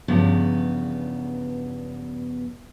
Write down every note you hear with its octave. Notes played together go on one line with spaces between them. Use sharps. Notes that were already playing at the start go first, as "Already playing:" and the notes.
E2 G2 C#3 F3 B3